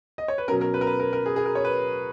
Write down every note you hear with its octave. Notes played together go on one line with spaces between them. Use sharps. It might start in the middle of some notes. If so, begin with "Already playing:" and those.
D#5
C#5
B4
B2 F#3 C#4 A#4
A#4
B4
A#4
B4
A#4
A#4
G#4
G#4
A#4
C#5
B4